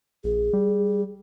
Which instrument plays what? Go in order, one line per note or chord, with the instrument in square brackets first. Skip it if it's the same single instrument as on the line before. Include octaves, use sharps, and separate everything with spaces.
[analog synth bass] A#1 [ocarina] G#4
[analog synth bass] G3